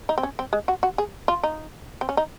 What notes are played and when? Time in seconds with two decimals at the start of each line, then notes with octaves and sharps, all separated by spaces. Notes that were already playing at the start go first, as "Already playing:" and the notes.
0.09 D#4
0.18 C4
0.23 C#4
0.39 C4
0.53 G#3
0.68 F#4
0.83 F#4
0.98 G#4
1.28 F4
1.43 D#4
2.01 C4
2.09 C#4
2.17 D#4